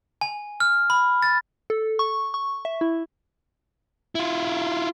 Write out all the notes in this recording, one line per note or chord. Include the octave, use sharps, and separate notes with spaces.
G#5
F6
B5
A6
A4
C#6
C#6
E5
E4
E4 F4